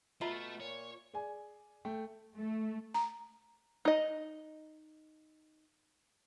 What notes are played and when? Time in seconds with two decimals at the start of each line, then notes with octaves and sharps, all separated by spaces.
0.21 B2 A3 F4 E5 A#5 B5
0.60 A#2 C#5
1.14 G#4 D5 G#5
1.85 A3 G5
2.36 A3
2.94 A#5
3.85 D#4 D#5